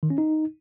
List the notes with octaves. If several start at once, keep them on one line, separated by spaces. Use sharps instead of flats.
D#3
C#4
D#4